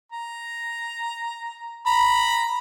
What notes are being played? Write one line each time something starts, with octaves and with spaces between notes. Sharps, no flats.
A#5
A#5 B5